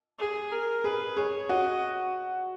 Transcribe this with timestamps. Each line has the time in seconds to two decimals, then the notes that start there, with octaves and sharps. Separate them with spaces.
0.19 G#4
0.52 A#4
0.84 G#4 B4
1.17 G#4 C#5
1.49 F#4 D#5